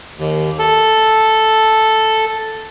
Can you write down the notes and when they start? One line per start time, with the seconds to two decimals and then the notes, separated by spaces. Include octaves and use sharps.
0.18 D#2
0.59 A4